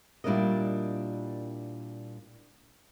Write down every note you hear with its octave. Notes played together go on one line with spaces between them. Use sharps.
A#2 G3 D4 E4 A#4 D#5